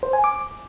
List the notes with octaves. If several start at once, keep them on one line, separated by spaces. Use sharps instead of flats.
C5
G#5
D6